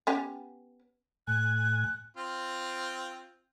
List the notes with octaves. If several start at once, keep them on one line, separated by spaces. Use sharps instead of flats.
B3 C#4 G4
A2 G#5 F#6
C4 F4